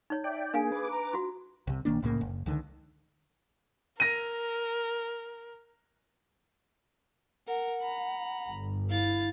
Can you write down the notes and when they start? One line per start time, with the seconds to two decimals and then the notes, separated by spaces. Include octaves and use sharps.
0.10 D#4 C#5
0.24 D5 E5 G5
0.54 A#3 D4 G#4 F5 G#5
0.72 B4 D6
0.91 A#5
1.13 F4 F#4
1.67 C2 C3
1.85 A#1 D#3 A#3 D4
2.02 C2 A2 C#3 A#3
2.21 F#1
2.46 C#2 D3 D#3
4.00 A#4 A#6 D#7
7.47 A#4 F#5
7.82 A#5 B5
8.50 G1
8.90 E4 F5 A6